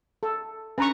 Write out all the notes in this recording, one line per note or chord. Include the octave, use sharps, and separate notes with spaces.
A4
C#4 D4 B4 A#5 C#6